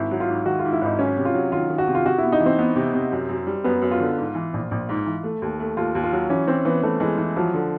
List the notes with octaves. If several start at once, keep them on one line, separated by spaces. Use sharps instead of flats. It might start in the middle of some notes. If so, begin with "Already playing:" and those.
Already playing: G#1 E4
F#3
F4
G#2
D#3 F#4
F4
G#2
E4
G#1 D#4
F#3 C#4
C3
F4
F#3
D#3 F4
D#3
F#4
C3
F4
C3 F#4
B3 E4
D#4
E3
C4
B3
C3
C3
F#2
F#2
G3
F#2 B3
F#2
F4
D3
G#2
E3
A#1
A#1
G#2
E3
A3
D#2
A3
D#2 F4
D#2
F4
F#3
E3 C#4
E3 C4
E3 B3
E3 A3
E3 G#3
E3
F3 F#3
D3